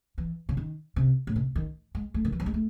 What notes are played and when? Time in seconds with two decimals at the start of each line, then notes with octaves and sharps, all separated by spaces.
0.18 E3
0.49 C#3
0.57 D#3
0.96 C3
1.27 A2
1.36 C3
1.56 D#3
1.95 G#3
2.14 A3
2.25 D#3
2.32 E3
2.40 F#3
2.46 G#3
2.54 A3